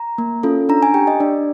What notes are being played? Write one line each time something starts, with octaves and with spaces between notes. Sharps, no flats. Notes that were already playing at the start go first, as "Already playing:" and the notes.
Already playing: A#5
A#3
C#4 F4 A4
D4 A#5
G#5
G4 G5
D#5
D4 D5